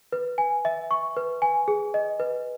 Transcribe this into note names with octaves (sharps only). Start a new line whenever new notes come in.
B4
G#5
E5
C#6
B4
G#5
G#4
D#5
B4